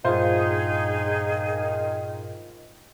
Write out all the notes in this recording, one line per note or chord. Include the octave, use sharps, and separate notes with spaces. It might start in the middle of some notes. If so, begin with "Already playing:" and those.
G2 A#2 D#3 D#4 F4 G#4 C5